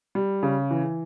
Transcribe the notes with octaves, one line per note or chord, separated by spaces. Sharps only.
G3
C#3
E3